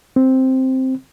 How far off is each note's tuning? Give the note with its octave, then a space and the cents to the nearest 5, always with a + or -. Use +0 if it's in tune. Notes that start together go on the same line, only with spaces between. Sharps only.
C4 +0